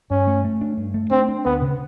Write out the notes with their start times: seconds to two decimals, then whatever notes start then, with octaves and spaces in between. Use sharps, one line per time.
0.10 G2 C#4
0.27 A3
0.45 A3
0.61 D4
0.77 G2
0.94 A3
1.11 C4 D4
1.28 D4
1.45 D2 B3
1.62 C#3